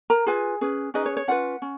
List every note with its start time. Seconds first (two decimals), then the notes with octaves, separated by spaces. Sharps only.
0.10 A#4 A#5
0.26 F4 G#4 B4 G#5
0.61 C#4 G#4 B4
0.94 C#4 D#4 G#4 B4 D#5
1.06 C#5
1.17 C#5
1.28 C#4 F4 B4 F#5
1.62 C#4